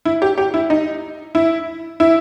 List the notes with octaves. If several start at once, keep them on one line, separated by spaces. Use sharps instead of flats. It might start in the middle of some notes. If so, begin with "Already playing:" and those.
E4
G4
G4
E4
D#4
E4
E4